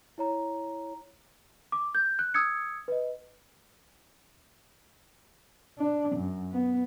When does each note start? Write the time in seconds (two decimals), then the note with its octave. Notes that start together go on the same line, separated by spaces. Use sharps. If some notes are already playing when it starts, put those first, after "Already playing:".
0.18 E4 C#5 A#5
1.72 D6
1.95 G6
2.19 F#6
2.34 D#6 E6 G#6 C#7
2.88 B4 D#5
5.79 D4
6.16 F#2
6.52 B3